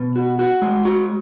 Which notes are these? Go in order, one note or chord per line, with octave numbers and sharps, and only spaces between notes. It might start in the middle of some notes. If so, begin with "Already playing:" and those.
Already playing: B2
F#4
F#4
G#3
F#4